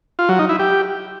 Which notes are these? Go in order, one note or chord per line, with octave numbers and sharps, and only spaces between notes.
F4
F#3
D#4
E4
G4